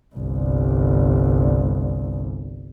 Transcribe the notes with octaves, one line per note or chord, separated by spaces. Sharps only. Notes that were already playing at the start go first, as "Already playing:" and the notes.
G1 C2